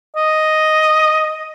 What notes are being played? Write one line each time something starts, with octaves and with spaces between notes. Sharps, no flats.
D#5